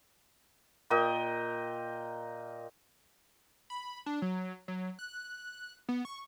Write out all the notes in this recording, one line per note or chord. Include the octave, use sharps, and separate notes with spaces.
A#2 A#4 D#5 G5
B5
D4
F#3
F#3
F#6
B3
C#6